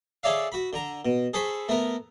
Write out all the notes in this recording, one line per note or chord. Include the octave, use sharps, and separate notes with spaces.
G#4 A4 C#5 D5 E5 F5
F#4 B5
D3 A#5
B2
G#4 A4 C5 B5 C#6
A3 B3 A#4